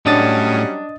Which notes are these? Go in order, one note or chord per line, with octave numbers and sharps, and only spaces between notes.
A2 F#3 G3 C#4 D4 D#5 D#6 A6